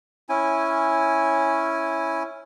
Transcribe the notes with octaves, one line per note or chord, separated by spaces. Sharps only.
C#4 E4 G#5